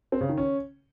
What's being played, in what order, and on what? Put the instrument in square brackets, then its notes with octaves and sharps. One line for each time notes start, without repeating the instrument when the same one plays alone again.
[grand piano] C4
C#3
D#3
C#4